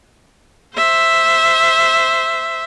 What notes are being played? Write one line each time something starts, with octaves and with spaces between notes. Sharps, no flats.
C5 E5